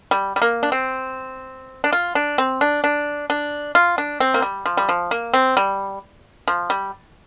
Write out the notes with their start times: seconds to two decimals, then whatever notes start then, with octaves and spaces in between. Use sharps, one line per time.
0.11 G3
0.36 G3
0.42 A#3
0.63 D4
0.72 C4
1.84 D4
1.93 F4
2.15 D4
2.38 C4
2.61 D4
2.84 D4
3.30 D4
3.75 F4
3.98 D4
4.20 C4
4.34 A#3
4.42 G3
4.66 F3
4.77 G3
4.89 F3
5.11 A#3
5.34 C4
5.57 G3
6.48 F3
6.70 G3